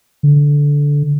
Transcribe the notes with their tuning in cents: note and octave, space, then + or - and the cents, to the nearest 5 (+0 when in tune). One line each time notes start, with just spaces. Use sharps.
D3 -15